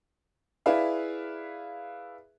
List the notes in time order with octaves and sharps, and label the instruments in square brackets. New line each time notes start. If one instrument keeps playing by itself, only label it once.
[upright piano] E4 G#4 B4 D5 E5 F5